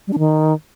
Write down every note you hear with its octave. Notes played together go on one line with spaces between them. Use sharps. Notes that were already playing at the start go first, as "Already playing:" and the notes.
G3
D4
D#3